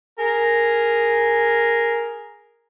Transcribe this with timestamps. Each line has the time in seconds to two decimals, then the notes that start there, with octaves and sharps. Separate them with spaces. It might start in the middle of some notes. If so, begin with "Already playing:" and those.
0.19 G#4 A#4